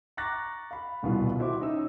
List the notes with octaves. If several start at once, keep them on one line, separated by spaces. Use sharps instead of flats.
A#5 C#6 D6 F#6 A6 A#6
F5 B5
D#1 C2 B2 E3 B3 F4
E4 F#4 C5 E5 C6 D6
C#4 D#4 E6